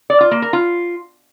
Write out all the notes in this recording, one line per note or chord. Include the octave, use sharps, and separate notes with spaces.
D5
F4
A#3
A#4
F4